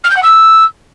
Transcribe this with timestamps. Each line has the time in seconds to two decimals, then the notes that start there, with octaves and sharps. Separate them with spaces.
0.04 F6
0.10 G6
0.16 F#5
0.22 E6